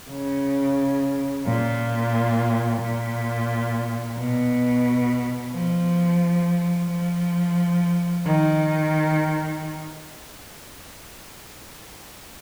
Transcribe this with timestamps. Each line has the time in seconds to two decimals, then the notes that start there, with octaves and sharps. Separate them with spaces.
0.11 C#3
1.47 A#2
2.82 A#2
4.19 B2
5.54 F3
6.90 F3
8.26 D#3